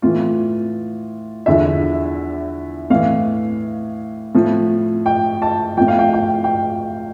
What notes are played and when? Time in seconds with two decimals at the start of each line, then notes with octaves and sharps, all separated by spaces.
0.02 A2 E3 F4
1.46 E2 D3 F3 E5
2.90 A2 E3 F5
4.35 A2 F3
5.06 G5
5.42 A5
5.77 A2 F3 G5
5.88 F5
5.99 G5
6.13 G5
6.44 G5